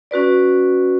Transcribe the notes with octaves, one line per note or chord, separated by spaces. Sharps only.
C#4 F#4 B4 D5